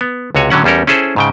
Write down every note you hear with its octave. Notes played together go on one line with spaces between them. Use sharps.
B3
C#2 C3 F#4 C#5 G#5
A2 D3 F#3 C#4 F#5
E2 G3 C#4 A4 A#4
C#4 E4 G#4 A4 C5
G#2 C#3 G5